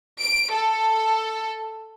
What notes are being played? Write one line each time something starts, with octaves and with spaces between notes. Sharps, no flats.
D7
A4